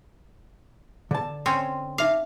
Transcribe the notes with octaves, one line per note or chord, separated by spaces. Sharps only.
D3 A5
C4 C#4 G5 C6
D#4 E5 F5 D6